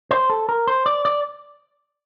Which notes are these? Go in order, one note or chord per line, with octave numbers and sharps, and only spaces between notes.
C5
A4
A#4
C5
D5
D5